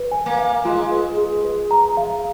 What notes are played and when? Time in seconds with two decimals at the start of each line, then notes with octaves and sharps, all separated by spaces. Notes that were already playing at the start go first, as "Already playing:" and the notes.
Already playing: B4
0.12 G#5
0.26 A#3
0.39 F5
0.65 G#3 F4
0.91 B4
1.17 G#4
1.44 B4
1.71 A#5
1.97 F5